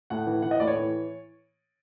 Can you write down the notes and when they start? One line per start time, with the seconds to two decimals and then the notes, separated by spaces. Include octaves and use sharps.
0.10 A2 F#5
0.27 E3
0.42 E3 F#5
0.51 D#5
0.60 A2 D5
0.67 C#5
0.76 E3